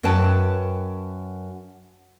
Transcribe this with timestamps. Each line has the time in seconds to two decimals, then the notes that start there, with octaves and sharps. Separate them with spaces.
0.03 F#2 C#4 B4 G5 A5